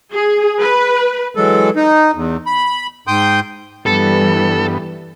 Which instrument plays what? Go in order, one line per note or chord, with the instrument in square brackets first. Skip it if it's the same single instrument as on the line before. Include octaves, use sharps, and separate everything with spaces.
[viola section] G#4
B4
[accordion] E3 F#3 G#3 A4
D#4
E2
B5
G#2 G5 C6 D#6 G6
[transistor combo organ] G2 B3 [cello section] E3 G3 [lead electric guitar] A4